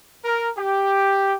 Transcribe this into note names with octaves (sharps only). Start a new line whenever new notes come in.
A#4
G4